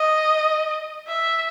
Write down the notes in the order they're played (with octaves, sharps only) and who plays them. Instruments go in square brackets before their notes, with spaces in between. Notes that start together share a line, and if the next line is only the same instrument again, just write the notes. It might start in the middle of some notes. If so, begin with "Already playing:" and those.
Already playing: [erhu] D#5
E5